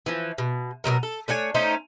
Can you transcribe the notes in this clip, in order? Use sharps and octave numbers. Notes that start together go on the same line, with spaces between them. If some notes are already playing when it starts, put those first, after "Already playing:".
E3 F3
B2
B2 D#3 F#3 A#4
A4
A3 D4 C#5 G#5
A3 C#4 D#4 C5